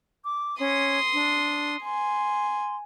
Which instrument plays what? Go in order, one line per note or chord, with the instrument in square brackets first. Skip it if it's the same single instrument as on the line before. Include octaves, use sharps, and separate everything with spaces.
[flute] D6
[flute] C#4 [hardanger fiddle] C6 D#6
[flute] D4
[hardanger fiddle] G#5 [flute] C6